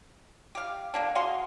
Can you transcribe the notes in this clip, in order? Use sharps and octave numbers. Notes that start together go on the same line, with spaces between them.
G4 F5
D3 A#3 D4
F#4 G#4 F5 C6